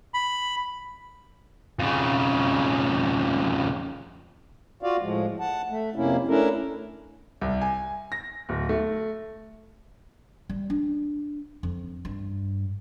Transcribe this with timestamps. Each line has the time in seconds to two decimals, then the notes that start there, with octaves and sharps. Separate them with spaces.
0.14 B5
1.79 F2 C#3
4.83 F4 F#4 D5 F5
5.01 A2 F3 G#3
5.40 F#5 A5
5.69 A3
5.96 F2 C3 A#3 C#4 E4
6.28 A3 C#4 D4 E4 A4 A#4
7.41 C2
7.61 G#5
8.12 A#6
8.49 D1
8.69 A3
10.49 G3
10.70 D4
11.63 F2
12.05 G2